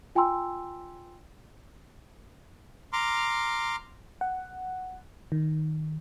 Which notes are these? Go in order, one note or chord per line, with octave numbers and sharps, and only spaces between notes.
F4 G5 G#5 A#5 C6 E6
A#5 C6 D6 F6
F#5
D#3